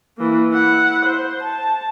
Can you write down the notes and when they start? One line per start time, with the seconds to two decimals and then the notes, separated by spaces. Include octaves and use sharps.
0.17 E3 A#3
0.51 E4 F#5
1.05 C5
1.43 A5